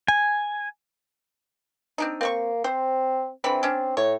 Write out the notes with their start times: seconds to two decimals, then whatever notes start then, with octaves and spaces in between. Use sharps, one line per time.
0.08 G#5
1.98 C4 D4 D#4
2.21 A#3 C4 B4 C#6
2.64 C4 C5
3.44 D3 E3 C4 B5
3.63 C#4 D4
3.97 A2 C#5